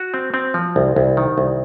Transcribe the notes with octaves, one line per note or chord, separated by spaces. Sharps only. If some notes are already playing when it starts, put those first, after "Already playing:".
Already playing: F#4
C4
C4
F3
C2
C2
D#3
C2